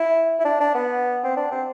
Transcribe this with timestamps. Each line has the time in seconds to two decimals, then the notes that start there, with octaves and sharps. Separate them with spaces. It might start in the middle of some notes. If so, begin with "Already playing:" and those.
Already playing: E4
0.40 E4
0.45 D4
0.60 D4
0.75 B3
1.24 C4
1.37 D4
1.51 C4